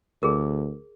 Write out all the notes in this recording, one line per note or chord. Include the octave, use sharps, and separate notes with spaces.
D2 G#4 A#4